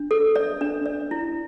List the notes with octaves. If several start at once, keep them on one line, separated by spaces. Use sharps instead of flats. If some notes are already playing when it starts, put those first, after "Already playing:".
Already playing: D4
A4
D5
D4
D5
E4